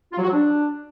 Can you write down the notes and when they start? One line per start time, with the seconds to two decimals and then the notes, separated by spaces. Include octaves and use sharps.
0.12 F4
0.17 F#3
0.22 F#4
0.28 F#3
0.33 D4